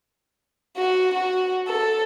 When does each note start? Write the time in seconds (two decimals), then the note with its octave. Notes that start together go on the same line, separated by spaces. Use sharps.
0.77 F#4
1.14 F#4
1.68 A4